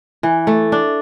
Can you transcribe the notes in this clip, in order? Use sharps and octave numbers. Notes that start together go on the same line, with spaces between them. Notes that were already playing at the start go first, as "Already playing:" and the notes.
E3
A3
D4